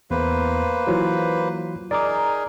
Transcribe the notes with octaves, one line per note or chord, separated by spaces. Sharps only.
E2 A#3 B4 C5
E3 F#3 F4
D#4 G#4 A#4 D5 D6